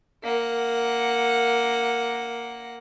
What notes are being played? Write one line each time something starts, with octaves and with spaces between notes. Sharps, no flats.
A#3 F#5